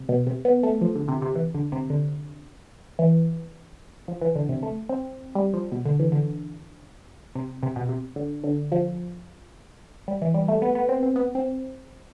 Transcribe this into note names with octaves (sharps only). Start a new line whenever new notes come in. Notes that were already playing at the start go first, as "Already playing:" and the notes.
Already playing: C3
B2
C3
B3
A3
F3
D3
C3
C3
E3
D3
C3
D3
E3
F3
E3
D3
C3
A3
C4
G3
F3
B2
D3
E3
D3
C3
C3
B2
C3
D3
D3
F3
G3
E3
G3
A3
B3
B3
C4
C4
B3
C4